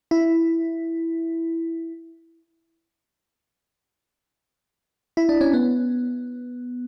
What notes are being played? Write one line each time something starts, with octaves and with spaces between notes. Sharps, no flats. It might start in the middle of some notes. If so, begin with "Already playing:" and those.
E4
E4
D4
C#4
B3